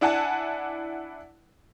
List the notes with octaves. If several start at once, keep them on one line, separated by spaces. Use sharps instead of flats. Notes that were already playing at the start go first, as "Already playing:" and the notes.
D4 E4 F#5 G#5 A5